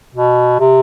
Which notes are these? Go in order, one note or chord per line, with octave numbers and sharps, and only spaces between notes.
B2
C3